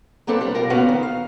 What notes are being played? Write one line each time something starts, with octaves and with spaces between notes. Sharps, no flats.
F#3 A#3 C4 D4 A4 B4
G3
B2 G3 F4 A#4
A#2 B3 C#4 F#4 B4 F5
D#3
F5